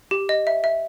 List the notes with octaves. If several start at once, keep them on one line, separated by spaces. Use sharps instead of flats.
G4
D#5
E5
E5